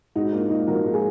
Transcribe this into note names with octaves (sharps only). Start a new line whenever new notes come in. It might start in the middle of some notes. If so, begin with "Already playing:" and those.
G#2 D#4 F#4
A#3 D4 F4
G#2 D#4
F3 F#4 A#4
G#2
F4 G#4